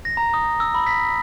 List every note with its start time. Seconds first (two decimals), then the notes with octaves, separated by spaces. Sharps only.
0.05 A#6
0.17 A#5
0.34 D#6
0.60 E6
0.74 B5
0.87 B6